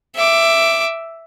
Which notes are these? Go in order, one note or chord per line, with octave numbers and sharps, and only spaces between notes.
E5 D6